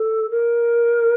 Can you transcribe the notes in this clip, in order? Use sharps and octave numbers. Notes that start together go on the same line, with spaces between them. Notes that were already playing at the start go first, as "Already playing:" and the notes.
Already playing: A4
A#4